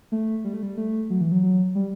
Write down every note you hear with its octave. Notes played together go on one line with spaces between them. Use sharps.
A3
G3
A3
G3
A3
F#3
E3
F#3
F#3
G3